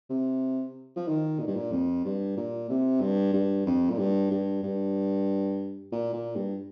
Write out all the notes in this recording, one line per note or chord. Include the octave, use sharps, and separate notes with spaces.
C3
F3
D#3
A#2
G2
A#2
F2
G2
A#2
C3
G2
G2
F2
A#2
G2
G2
G2
A#2
A#2
G2